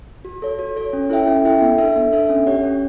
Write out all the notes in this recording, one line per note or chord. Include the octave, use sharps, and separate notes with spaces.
F#4
A4 C#5
F#4
A4 C#5
C#4
E4 A4 E5 G5
C#4
E4 A4 E5 G5
B3
D4 A4 E5
B3
D4 A4 E5
C#4
G4 C#5 F#5
C#4